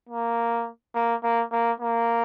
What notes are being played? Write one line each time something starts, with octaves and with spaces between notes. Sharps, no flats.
A#3
A#3
A#3
A#3
A#3